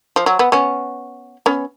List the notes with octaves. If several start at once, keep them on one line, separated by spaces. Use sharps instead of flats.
F3
F#3
B3
B3 C#4
B3 C#4